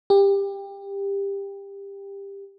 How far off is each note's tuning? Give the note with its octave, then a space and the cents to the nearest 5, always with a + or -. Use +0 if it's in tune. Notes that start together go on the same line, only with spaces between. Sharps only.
G4 +20